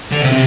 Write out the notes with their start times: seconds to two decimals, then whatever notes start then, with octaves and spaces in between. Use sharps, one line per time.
0.11 D3
0.21 C3
0.32 C3